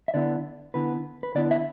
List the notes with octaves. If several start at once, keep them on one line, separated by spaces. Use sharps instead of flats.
E5
D3 B3 E4 D5
D3 B3 E4 B4
B4
D3 B3 E4 D5
E5